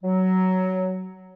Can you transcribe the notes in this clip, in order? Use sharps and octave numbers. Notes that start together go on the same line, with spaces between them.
F#3